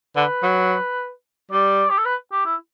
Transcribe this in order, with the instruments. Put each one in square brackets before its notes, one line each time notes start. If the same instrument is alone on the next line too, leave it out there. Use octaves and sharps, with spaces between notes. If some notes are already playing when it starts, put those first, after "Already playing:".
[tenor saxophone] D3 [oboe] B4
[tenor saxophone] F#3
[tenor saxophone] G3 [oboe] D5
[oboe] G4
A4
B4
G4
E4